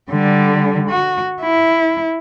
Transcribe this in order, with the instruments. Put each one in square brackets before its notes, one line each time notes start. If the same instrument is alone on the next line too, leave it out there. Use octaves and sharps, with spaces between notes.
[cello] D3 G3
F#4
E4